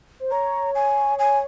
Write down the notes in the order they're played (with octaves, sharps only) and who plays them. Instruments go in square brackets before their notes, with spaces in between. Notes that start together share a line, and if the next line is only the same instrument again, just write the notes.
[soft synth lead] C5
[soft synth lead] C#5 [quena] A#5
[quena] G#5
G#5